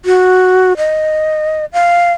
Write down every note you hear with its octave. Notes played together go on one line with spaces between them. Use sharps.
F#4
D#5
F5